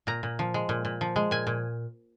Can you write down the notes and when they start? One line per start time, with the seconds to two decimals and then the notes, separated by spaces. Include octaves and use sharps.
0.07 A#2 A#5
0.23 A#2
0.39 F3
0.54 G#3
0.69 A#2
0.85 A#2
1.01 F3
1.16 G#3
1.31 A#2 G#5
1.47 A#2